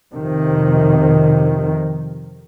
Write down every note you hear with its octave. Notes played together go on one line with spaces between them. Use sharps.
F2 C3 D#3